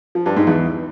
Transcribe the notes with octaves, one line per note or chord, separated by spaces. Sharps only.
F3
G2
G#2
E2